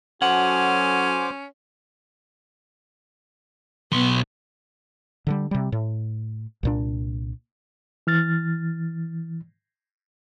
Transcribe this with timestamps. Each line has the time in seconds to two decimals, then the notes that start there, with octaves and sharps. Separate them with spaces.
0.22 F#3 C#4 F#4 A4 C5 F#5 G#5 D6
3.93 B1 B3 C6
5.27 D3 D#3 G3
5.51 C3 G3
5.72 A2
6.63 C2 A#2 D4
8.07 E3 F6 A6